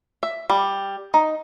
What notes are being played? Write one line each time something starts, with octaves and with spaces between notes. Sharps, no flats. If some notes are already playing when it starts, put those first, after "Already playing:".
E5
G3
D#4